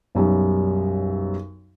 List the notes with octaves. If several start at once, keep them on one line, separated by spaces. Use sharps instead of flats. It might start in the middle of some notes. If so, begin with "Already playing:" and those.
B1 F#2 G3